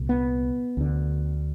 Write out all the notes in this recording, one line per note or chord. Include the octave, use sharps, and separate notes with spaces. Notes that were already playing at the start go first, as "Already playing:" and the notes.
Already playing: C2 A#2
B3
D2 D3